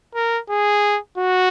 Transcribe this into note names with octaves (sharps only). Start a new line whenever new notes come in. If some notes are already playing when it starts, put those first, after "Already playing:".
A#4
G#4
F#4